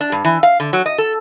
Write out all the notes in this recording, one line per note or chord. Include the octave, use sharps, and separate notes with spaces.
D4
G2
E3
F5
D3
F#3
D#5
A4